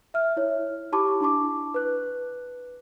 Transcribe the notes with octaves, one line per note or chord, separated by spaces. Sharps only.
E5 F6
E4 C#5
E4 G4 A5 B5 C#6 D6
D4 E4 A5 C#6 D6
B4 F#6